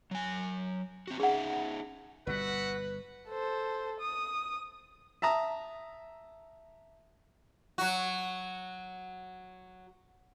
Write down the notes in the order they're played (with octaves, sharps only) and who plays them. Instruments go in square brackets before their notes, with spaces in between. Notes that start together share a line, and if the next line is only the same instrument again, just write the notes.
[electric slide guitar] F#3 G#5
C4 F#4
[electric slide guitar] C#4 D#4 E5 [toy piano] G#4 F#5
[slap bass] G1 B2 G3 [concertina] F#4 [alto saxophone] B4 [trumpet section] E5 F#5
[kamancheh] A4 C5
D#6
[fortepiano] E5 A5 A#5 D#6
[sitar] F#3 F#4